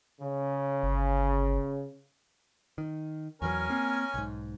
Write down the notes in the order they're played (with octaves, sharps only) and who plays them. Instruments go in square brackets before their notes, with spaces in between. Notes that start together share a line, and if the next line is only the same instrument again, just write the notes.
[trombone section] C#3
[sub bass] G1
[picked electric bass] D#3
[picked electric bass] E2 E3 F#3 [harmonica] C#4 G#5 [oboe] A#4
[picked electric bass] A#3 C4
B1 G#2